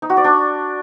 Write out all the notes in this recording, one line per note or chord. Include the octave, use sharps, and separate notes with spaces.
D#4
F#4
D5
D4